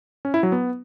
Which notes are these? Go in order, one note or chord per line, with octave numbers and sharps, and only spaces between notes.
C#4
E4
F#3
B3